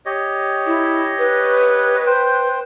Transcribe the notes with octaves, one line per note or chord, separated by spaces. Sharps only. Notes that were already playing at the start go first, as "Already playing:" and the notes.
G4 C#5 D#5
E4
B4
C5 G5